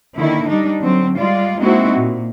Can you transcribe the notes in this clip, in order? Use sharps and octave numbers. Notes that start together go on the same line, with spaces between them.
D3 D#3 A#3 E4
G3 D4 D#4
D3 F#3 C4
G3 G#3 F4 D5
G#3 A#3 C4 D#4 E4 F#4
A#2